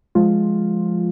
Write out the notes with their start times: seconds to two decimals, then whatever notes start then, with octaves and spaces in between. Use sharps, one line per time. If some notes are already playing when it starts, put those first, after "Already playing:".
0.15 F3 G#3 F4